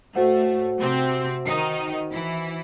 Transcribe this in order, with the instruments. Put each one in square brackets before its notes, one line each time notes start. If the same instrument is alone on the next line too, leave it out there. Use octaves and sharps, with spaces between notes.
[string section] A2 A3 [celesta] F#4 C5 F#5
[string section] C3 C4
D#3 D#4
E3 E4